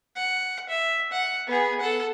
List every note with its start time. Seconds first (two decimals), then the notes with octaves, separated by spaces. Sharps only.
0.16 F#5
0.69 E5
1.12 F#5
1.47 B3 G#4
1.80 A4 F#5